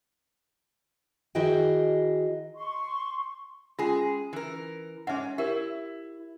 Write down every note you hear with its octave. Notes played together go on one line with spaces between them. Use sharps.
D#3 E4 F#4 G#4 D#5 G5
C6 C#6
G#3 C#4 F4 G#4
E3 A#4
G#2 C#4 G#4 E5 F#5
E4 G4 A#4 C#5